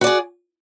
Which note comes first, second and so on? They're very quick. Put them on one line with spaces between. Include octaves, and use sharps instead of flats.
F#4 D5 G#4